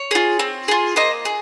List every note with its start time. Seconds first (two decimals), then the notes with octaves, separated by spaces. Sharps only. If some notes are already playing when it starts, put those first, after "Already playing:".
Already playing: C#5
0.11 F4 G#4
0.39 C4
0.68 F4 G#4
0.96 A#3 C5 D#5
1.25 G#4